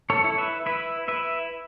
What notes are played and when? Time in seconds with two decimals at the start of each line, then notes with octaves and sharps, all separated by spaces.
0.10 A4 C#5
0.24 E4
0.38 B4 E5
0.66 E4 B4 E5
1.08 E4 B4 E5